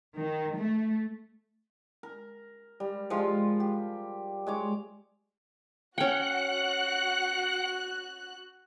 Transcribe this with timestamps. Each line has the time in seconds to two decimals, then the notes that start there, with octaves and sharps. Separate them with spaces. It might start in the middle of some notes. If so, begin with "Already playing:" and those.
0.17 D#3
0.58 A3
2.03 A#4
2.80 G3
3.10 F3 G3 G#3 F4
3.60 G4
4.47 G#3 C#5 D6
5.98 C#4 F#4 F#5 G5 F#6